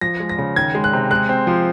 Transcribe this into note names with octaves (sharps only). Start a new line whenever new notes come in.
F3 A#6
G#3
A#6
C#3
D#3 G#6
G#3
F#6
C3
G#3 F#6
C4
F3